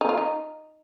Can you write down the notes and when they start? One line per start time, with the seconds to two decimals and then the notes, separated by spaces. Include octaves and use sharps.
0.01 D#4
0.09 F4
0.18 D#4